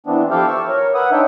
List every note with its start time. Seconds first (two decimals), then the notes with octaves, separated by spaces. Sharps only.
0.07 E3 B3 C4 D4
0.31 F3 E4 G4 A4 F5 G5
0.47 C#6 E6
0.68 A#4 C#5
0.95 B4 E5 F#5 D#6
1.12 D4 D#4 C#5 E5 G5